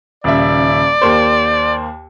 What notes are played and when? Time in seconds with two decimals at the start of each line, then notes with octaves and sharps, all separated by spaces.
0.24 D#1 C#3 D5 E5
1.01 D#2 A#3 C5